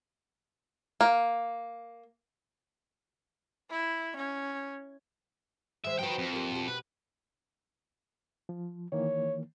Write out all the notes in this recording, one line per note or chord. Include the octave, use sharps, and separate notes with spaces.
A#3
E4
C#4
D#3 G#3 C5 E5
F3 D#4 F#4 B4 G5
F2
A#3 G4
B2 G4
B4
F3
D#3 E3 A#3 C#5